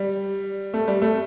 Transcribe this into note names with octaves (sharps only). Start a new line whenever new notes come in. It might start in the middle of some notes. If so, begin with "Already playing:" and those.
Already playing: G3
A3
G3
A3